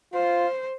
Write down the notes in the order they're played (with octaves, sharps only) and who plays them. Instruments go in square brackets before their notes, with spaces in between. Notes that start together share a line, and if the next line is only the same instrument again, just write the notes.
[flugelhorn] F4 [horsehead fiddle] C5